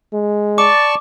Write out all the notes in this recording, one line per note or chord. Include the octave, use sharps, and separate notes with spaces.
G#3
D5 A5 C#6 D6